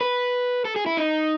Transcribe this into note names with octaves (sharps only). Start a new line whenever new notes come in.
B4
A4
G#4
E4
D#4